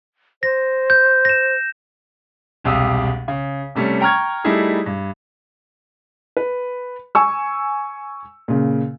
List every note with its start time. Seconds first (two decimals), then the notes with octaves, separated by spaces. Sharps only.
0.43 C5 A#6
0.90 G6
1.25 A#6 E7
2.64 E1 C2 G4 F5 D#6 E6
3.28 C#3
3.75 C3 G3 A3 C#4
4.01 G5 A#5 C#6 F6 G#6
4.44 G3 A3 D#4 E4 G#4
4.86 G2
6.37 B4
7.15 G#5 C#6 E6
8.48 A#2 C#3